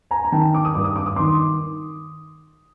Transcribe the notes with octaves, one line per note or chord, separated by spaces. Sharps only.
G#5 A#5
A#5
D#3 G5 A5
D6
D#6
G2 D6
D#6
D6
D#6
D#3 C6 D6